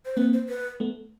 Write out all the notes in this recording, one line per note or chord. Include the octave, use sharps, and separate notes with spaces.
C5
A#3 C4 B4
C5
B4
A3 B3